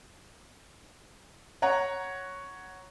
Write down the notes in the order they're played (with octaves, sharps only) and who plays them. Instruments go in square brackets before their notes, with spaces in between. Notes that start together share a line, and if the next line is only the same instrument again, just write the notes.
[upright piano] C#5 F#5 A#5